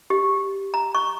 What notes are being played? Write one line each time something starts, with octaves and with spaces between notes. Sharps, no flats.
G4
A#5
C#6